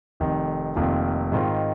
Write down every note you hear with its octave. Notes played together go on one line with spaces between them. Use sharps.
F1 F2 D#3
F1 F2 D#3 A#3 F4
G#2 D#3 C4 F4